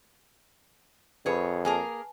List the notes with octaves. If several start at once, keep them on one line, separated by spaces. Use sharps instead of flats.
F2 G#4 B4 C#5 B5
A#3 G#4 A#4 G#5 A5